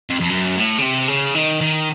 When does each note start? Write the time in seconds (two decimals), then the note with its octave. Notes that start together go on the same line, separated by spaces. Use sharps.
0.10 F2
0.20 F2
0.30 F#2
0.56 A2
0.78 C#3
0.82 C3
1.08 C#3
1.35 D#3
1.61 D#3